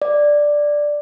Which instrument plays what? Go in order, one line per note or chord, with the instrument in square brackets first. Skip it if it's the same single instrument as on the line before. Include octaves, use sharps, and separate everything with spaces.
[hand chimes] D5